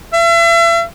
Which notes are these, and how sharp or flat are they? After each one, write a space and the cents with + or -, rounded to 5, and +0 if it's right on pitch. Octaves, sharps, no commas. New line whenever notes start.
E5 +40